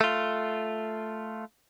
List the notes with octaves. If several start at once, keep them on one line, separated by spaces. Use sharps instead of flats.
A3 F4